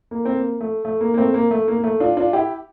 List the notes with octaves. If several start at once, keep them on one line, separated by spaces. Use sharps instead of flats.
A#3
C4
A#3
A3
A3
A#3
A#3
A3 C4
A#3
A3
A#3
A#3
A3
D4 F4
D4 F4
E4 G4